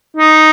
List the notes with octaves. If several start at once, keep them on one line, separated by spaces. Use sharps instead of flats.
D#4